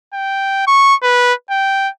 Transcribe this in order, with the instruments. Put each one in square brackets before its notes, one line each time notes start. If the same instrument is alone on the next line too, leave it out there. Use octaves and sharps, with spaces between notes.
[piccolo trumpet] G5
C#6
B4
G5